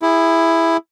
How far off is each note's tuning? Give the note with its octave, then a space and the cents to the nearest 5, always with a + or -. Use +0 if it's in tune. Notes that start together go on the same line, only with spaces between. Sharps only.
E4 +5 G#4 -25